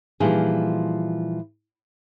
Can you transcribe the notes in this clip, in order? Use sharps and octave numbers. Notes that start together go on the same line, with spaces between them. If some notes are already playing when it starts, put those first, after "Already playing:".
A#2 E3 F3 G3 D#4 G#4